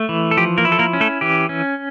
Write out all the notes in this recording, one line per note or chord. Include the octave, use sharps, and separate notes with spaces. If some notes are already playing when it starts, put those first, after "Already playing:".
Already playing: A3
E3
A4
F3 G4
A#3 A#4
E4
A4
A#3 A#4
C#4
A3 A4
E3 G4
C#4